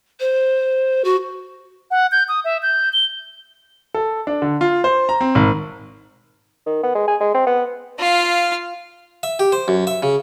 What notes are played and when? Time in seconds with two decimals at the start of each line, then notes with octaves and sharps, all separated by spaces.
0.20 C5
1.04 F#4
1.91 F#5
2.12 G6
2.28 D#6
2.44 E5
2.63 G6
2.93 G7
3.94 A4
4.27 D4
4.42 D3
4.61 F4
4.84 C5
5.09 A#5
5.21 C4
5.35 G#1
6.66 D#3
6.83 B3
6.95 G#3
7.08 G#4
7.20 G#3
7.34 C4
7.47 B3
7.98 F4 F5
9.23 E5
9.39 G4
9.52 C5
9.68 F#2
9.87 E5
10.03 C#3